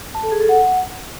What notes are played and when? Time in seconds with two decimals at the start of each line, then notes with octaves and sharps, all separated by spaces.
0.15 A5
0.23 A4
0.32 G#4
0.40 A4
0.49 F#5